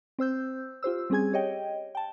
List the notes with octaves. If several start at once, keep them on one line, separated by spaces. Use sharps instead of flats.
C4 C5 E6 G6
F4 G4 C5 E6
G3 C4 C#4 G#4 G#5 G#6
G4 C#5 D#5 G5
G5 A5